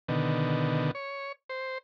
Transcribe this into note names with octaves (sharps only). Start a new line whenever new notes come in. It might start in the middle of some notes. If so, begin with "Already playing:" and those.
B2 D3 D#3
C#5
C5